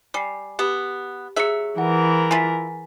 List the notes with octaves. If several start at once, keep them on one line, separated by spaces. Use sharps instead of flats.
G3 G#5 C7
B3 G4
F#3 G#4 E5 C#7
E3 A#4 F#5
E4 F4 G#5 A6 B6